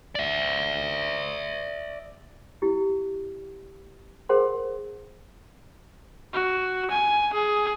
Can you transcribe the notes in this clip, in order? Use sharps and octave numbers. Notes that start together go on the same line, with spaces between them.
D5 E5
E4 G4
G#4 A#4 C5 F#5 C6
F#4
G#5
G#4